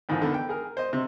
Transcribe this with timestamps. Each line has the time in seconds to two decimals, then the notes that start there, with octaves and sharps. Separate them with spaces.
0.09 F2 G#2 D#3 E3
0.22 D3 D#3 B3 A4
0.34 G5
0.49 G#4 A#4
0.77 C5 D#5
0.93 C3